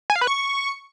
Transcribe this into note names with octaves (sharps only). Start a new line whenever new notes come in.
G#5
F5
B4
C#6